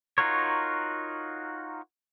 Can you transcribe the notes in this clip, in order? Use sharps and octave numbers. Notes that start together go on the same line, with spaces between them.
D#4 F4 F#4 A#4 C#5